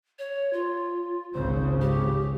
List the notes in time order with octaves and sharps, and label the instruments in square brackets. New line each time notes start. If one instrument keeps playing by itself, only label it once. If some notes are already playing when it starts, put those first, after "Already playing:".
[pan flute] C#5
F4
[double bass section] G#1 C#2 C#3 [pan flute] C5
[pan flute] G4